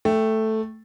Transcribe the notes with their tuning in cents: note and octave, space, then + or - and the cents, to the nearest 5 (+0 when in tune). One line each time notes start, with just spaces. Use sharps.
A3 +0 G5 +0